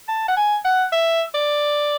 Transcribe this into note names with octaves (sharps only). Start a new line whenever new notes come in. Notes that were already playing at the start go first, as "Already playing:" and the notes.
A5
F#5
G#5
F#5
E5
D5